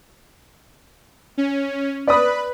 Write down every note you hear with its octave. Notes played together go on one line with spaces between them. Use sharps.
C#4
B4 D5 B5 D#6